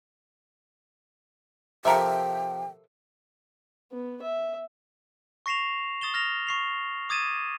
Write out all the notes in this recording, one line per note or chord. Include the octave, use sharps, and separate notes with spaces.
C3 F3 A4 A#4 E5 G5
B3
E5
C#6 A#6 C7 E7 F7
D#6 A6 E7 G7
F6 A#6 F7
C#6 C7 F7
D6 D#6 G#6 A6 D#7 E7